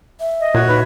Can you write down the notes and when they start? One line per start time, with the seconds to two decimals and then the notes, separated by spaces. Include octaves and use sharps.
0.20 E5
0.40 D#5
0.54 A#2 F#4 C#5
0.68 D#4 B4